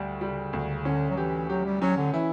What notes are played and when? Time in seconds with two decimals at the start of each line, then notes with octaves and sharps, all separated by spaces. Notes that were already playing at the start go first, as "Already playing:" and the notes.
Already playing: D2 G3
0.21 C#3 G3
0.53 D2
0.85 D3 C#4
1.10 F#3
1.17 E3 G4
1.49 F#3 G4
1.65 G3
1.81 F#3 C#4
1.97 D3
2.13 E3 E4